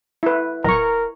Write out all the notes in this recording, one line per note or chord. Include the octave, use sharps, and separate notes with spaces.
E4 B4
D1 A#4 A#5 C#6